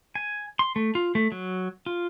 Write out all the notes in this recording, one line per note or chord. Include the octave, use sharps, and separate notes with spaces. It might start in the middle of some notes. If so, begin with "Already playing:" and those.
G#5
C6
A3
F4
A3
F#3
F4